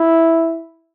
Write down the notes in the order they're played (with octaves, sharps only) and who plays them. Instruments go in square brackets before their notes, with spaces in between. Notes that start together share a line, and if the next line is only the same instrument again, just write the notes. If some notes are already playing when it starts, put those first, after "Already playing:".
Already playing: [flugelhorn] E4